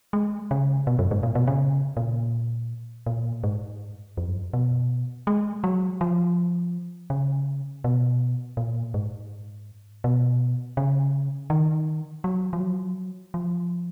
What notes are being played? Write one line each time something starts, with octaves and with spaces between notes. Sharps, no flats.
G#3
C#3
B2
F#2
G#2
A#2
B2
C#3
A#2
A#2
G#2
F2
F#2
B2
G#3
F#3
F3
C#3
B2
A#2
G#2
B2
C#3
D#3
F#3
F3
F#3
F3